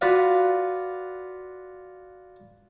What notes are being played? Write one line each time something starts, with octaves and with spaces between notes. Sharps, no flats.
F4 F#4 B4 D5 F5